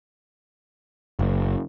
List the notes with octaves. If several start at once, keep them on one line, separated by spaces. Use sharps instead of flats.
F#1